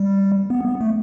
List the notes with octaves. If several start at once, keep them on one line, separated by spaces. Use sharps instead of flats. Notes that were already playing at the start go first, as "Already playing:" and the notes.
Already playing: G3
B3
B3
A3